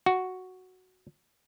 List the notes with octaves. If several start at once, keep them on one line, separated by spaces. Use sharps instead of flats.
F#4